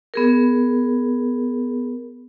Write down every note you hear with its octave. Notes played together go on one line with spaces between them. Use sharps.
B3 G#4 A#4